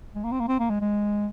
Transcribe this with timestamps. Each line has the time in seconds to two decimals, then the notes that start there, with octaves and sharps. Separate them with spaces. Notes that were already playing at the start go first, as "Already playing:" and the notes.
0.15 G#3
0.24 A#3
0.32 C4
0.40 A#3
0.48 C4
0.60 A#3
0.70 G#3
0.81 G#3